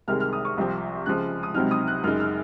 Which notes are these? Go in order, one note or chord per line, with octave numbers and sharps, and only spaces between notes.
C2 C3 D#3 G#3 F6
F6
D#6
C#6
C2 C3 F3 C4
C#2 C#3 F3 G#3 F#6
D#6
C#2 C3 F#3 C4 D#4 F6
D#6
F#6
F#2 C#3 G#3 D#4 F6
F6